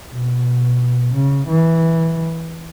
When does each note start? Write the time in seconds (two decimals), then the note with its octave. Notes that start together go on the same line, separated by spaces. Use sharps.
0.12 B2
1.14 C#3
1.47 E3